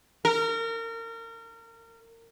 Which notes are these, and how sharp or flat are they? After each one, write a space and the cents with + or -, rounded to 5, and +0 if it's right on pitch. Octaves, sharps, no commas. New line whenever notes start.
A#4 -30